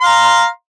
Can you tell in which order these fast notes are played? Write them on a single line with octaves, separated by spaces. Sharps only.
C6 F5 A#5